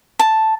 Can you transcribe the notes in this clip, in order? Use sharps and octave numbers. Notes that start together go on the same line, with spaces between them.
A5